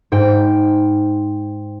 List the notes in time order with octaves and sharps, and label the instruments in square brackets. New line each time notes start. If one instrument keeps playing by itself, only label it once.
[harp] G#2 G5